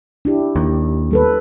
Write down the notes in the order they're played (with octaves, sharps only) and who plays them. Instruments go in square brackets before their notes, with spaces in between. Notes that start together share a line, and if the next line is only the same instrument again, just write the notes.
[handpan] D4 E4 G4
[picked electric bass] D#2
[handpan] G3 A4 B4